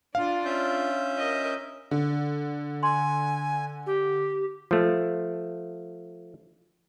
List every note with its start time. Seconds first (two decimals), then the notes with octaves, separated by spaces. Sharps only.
0.15 D4 F4 F5
0.45 C#4 E5 G6
1.18 A#4 D#5
1.91 D3
2.83 G#5 C6
3.86 G4
4.71 F3 A3